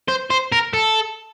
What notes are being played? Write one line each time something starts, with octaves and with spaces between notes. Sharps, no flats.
C5
C5
A#4
A4